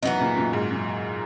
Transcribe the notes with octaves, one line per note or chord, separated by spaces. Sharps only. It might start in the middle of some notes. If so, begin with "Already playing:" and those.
F#2 E3 B3 D#4
A#2 C#3
F#2 A#2
G#2
F#2